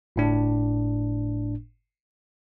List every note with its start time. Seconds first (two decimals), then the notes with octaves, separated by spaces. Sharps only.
0.16 G1 A2 D4